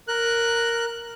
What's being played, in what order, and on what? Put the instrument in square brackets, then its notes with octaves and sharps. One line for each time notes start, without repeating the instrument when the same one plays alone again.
[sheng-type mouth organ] A#4 F#6